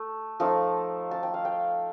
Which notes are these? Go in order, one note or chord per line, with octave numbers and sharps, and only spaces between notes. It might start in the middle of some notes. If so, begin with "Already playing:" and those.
Already playing: A3
F3 A3 D#4 A5
A5
G5
F5
G5